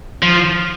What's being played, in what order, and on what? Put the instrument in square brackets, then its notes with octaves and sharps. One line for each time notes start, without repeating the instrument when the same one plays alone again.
[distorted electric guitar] F3